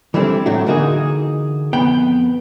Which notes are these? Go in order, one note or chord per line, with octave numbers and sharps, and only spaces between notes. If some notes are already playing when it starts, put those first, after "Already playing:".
E3 G3 A3 C4 D4 E4
A2 F#3 A3 D4 F#4
D3 E3 A#3 D#4 F#4 G#4
F2 B3 G5 B5